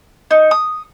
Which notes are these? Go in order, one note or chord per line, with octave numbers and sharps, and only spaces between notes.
D#4
D#6